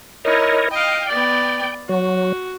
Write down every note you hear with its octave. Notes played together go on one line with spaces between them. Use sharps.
D#4 E4 A#4 C#5 D#5
D#5 F5 G5
B3 D5
F#3 F#4